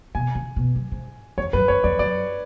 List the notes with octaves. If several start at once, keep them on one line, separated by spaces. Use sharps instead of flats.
B2 G#5
C#3
B2
F#2
G#2
F2 C#5
F#2 B4
F#2 C#5
F2 D5
F#2 D5